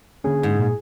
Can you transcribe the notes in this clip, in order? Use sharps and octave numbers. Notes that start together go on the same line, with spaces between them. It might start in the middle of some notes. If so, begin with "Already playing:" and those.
D3 A#3 C#4 G#4
G#2
A#2